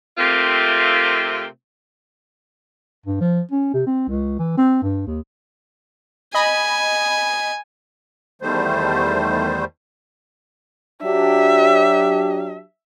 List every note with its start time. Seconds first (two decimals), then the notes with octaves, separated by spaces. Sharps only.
0.17 C3 A3 A#3 C4 F4
3.06 G2
3.20 F3
3.51 C#4
3.74 C3
3.87 C4
4.08 C#2
4.39 E3
4.58 C4
4.82 G2
5.07 D#2
6.35 D#5 G#5 B5
8.42 E2 D#3 G3 A3 C5
11.03 F#3 D4 G4 E5